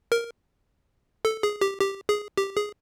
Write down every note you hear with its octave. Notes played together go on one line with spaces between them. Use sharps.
A#4
A4
G#4
G4
G4
G#4
G4
G#4